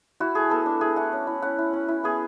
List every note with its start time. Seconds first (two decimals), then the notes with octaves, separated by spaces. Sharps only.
0.20 E4 F#4
0.35 A3 G#4
0.50 B3 A4
0.66 D4
0.81 E4 G#4
0.96 A3 F#5
1.13 C#4
1.27 E4
1.42 C#4 F#5
1.59 E4
1.73 C#4
1.88 E4
2.04 B3 G#4